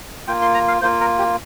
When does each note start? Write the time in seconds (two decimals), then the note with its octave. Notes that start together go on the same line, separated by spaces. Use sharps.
0.27 A#3 F4 G5
0.42 C6
0.54 A#5
0.68 F5
0.82 A#3 F4 C5
1.01 A#4
1.18 G4